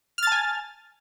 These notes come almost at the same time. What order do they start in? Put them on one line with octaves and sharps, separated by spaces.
F6 A6 A5 G#5